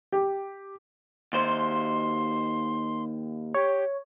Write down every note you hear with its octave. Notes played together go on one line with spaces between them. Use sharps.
G4
D#2 C5 C6
G4 C#5